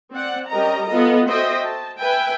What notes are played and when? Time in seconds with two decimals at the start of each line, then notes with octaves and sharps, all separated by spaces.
0.12 C4 D5 F#5
0.50 G3 C#4 G4 A#4 D#5 A#5
0.87 B3 F4 A4 D#5
1.29 F#4 A4 C5 D#5 E5 G5
1.66 A5
2.01 B4 E5 G5 G#5